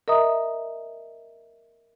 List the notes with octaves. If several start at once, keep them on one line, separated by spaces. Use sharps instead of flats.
A#4 D#5 E5 A#5 D#6